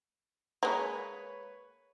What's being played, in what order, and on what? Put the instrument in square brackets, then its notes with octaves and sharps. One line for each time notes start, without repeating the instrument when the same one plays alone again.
[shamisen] G#3 A#3 [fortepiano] B4 C#5